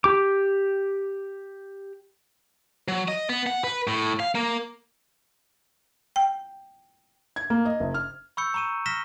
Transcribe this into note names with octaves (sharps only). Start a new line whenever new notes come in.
G4 D6
F#3
D#5
B3
F#5
B4
A2
F5
A#3
G5
G#6
A#3
D#5
F#1
F6
B5 C#6 E6 G6 C#7
A#5 B5 C#6 D#7 E7
F6 A#6 B6 E7 G7